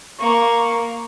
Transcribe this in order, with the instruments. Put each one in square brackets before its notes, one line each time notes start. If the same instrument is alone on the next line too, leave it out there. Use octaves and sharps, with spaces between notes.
[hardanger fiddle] A#3 [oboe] C#6